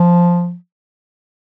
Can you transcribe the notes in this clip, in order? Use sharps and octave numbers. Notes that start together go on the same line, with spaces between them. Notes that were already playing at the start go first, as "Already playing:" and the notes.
Already playing: F3